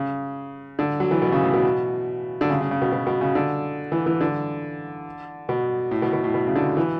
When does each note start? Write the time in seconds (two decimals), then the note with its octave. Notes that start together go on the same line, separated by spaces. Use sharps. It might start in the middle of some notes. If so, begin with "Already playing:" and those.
Already playing: C#3
0.79 D3
1.00 F#3
1.11 E3
1.22 B2
1.32 C#3
1.43 A2
1.53 B2
2.41 D3
2.50 C#3
2.61 C#3
2.71 C#3
2.82 B2
2.92 B2
3.07 B2
3.21 C#3
3.35 D3
3.92 E3
4.06 E3
4.21 D3
5.49 B2
5.91 A2
6.02 B2
6.13 B2
6.24 A2
6.34 B2
6.47 C#3
6.56 D3
6.77 E3